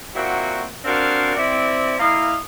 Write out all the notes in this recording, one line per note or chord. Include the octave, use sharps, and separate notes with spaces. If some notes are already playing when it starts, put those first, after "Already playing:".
A#2 A#3 C4 E4 F#4
C4 D4 F#4 A#4 C5 F5
C4 E4 D5
A#3 E4 D#5 F5